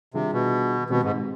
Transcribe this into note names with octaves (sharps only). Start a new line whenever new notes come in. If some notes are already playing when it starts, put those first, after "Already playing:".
C3 D#3 G3 D4 F4 G#4
B2
B2 D#3 G#3 C4 G4
G#2